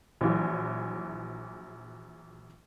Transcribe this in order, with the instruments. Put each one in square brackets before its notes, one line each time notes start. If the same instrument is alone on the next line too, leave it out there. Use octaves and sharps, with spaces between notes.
[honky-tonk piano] A#1 E3 F#3